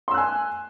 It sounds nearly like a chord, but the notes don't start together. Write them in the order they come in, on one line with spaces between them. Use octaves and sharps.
C6 E6 F#6 G#5